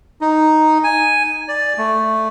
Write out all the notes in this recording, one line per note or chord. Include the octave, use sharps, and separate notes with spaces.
D#4
G#5
D5
A3